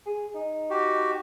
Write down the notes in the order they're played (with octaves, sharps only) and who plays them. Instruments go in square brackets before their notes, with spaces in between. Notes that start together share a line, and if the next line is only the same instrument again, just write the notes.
[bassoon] G#4
D#4
[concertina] F#4 G4